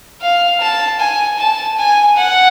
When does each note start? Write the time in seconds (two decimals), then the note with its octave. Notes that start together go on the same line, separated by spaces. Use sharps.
0.22 F5
0.61 A5
1.00 G#5
1.39 A5
1.78 G#5
2.17 F#5